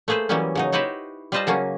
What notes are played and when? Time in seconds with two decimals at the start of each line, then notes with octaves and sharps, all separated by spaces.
0.08 A3 A#3 G#4 B4 C5
0.29 E3 F#3 G3 A#3 B3 C#4
0.55 C#3 F#3 D#4
0.72 D#4 E4 F#4 G4 B4 C5
1.32 G3 F4 B4 C5 D#5 A5
1.47 C#3 F#3 A#3 C#4